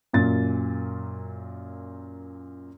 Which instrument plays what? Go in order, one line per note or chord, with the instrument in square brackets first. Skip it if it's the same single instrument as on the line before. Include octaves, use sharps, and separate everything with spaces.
[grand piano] F#2 A#2 A6